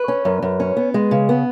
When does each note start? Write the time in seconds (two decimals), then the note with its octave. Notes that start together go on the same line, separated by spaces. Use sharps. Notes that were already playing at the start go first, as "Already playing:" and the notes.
Already playing: B4
0.08 C#4
0.25 F#2
0.42 F#2
0.60 C#4
0.77 B3
0.94 G#3
1.11 C#3
1.29 B3